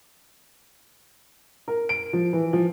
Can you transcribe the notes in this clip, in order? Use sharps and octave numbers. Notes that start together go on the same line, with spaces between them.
A#4
D7
F3
E3
F3